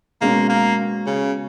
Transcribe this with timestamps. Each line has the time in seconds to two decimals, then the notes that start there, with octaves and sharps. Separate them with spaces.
0.21 B2 G#3 A#3 C#4
0.50 A#3
1.07 C#3